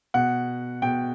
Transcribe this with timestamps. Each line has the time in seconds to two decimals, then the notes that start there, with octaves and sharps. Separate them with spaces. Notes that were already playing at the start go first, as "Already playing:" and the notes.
0.14 B2 F#5
0.82 B2 G5